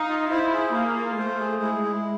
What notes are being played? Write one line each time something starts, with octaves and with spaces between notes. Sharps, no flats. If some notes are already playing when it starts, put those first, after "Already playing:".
Already playing: D#4 F5
F4
E4 C5
G#4
A#3 F5
F4
A3 C5
G#4
G#3 E4
E4